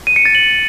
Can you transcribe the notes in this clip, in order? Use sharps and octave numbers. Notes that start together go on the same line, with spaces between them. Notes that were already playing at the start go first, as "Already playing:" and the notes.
D#7
C#7
A6
F#7